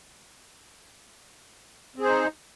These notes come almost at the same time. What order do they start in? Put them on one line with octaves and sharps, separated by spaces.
C4 G#4 C5 D#4